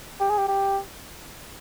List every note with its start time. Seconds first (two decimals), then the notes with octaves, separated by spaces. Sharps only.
0.20 G4
0.30 G#4
0.38 G4
0.48 G4